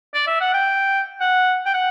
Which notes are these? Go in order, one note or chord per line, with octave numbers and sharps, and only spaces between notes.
D5
E5
F#5
G5
F#5
G5
F#5